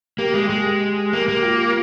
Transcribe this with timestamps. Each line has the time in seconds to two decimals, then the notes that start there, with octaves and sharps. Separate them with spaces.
0.18 A#3 G4
0.34 G#3
0.49 G#3 G4
1.13 A#3
1.28 A#3
1.45 F4